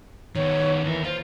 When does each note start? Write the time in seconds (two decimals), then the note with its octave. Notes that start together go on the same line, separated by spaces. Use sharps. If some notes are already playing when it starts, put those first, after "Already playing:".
0.36 D#3 B3 C#5
0.84 D#2 E3 A#4
1.05 F4 C5